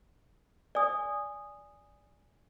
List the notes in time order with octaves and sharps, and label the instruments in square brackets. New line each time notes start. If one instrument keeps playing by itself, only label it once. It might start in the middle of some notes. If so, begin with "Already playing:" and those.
[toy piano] D5 G#5 D#6